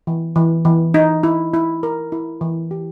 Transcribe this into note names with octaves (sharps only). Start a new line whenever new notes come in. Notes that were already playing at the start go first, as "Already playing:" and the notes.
E3
E3
E3
D#4
E4
E4
A#4
E4
E3
G4